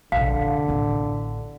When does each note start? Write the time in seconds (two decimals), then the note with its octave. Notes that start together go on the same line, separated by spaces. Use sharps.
0.12 F1 A#1 D3 F5
0.68 A1 B3